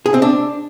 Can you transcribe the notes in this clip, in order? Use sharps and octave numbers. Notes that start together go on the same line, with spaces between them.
G#4
C4
D4